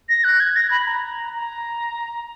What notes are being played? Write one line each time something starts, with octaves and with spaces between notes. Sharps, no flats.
A#6
F#6
G#6
A#6
B5
A#5
A#5